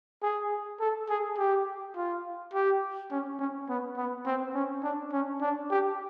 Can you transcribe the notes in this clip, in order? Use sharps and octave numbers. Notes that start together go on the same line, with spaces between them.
G#4
A4
G#4
G4
F4
G4
C#4
C#4
B3
B3
C4
C#4
D4
C#4
D4
G4